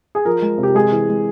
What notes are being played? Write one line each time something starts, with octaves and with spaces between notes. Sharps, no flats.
G#4
F3 A#4
G#3
C3
G4
G#3 G#4
E3
G#3